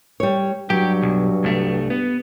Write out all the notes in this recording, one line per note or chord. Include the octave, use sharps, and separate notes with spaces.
G3 C#5
G2 F#3 G4
B1
C2 A3
B3